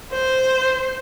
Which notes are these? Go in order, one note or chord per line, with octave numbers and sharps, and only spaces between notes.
C5